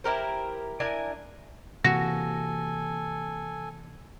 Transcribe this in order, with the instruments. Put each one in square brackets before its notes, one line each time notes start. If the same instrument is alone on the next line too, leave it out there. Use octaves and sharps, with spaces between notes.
[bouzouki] E4 G4 A#4 C5
D4 E4 A#4 G#5
[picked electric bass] C3 E3 A#3 [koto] F#4 [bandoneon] A4 G#5 [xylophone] A#6